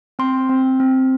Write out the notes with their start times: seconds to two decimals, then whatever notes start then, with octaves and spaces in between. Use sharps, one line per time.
0.19 C4 C6
0.49 C4
0.80 C4